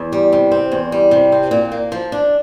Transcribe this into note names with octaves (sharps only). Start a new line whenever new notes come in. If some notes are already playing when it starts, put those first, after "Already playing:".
Already playing: E2
G3
C3
C4
E2
G3
C3
C4
A#2
A#3
F3
D4